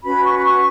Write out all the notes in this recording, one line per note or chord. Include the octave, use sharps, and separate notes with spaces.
C#4 F#4 B4 B5
C#6
B5
C#6